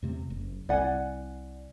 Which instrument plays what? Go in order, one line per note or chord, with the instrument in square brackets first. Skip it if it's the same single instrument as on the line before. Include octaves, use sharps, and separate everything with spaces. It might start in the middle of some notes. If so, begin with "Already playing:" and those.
[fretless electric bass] E2 C3 A3
F#1
[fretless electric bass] C2 [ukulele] D5 F#5 G#5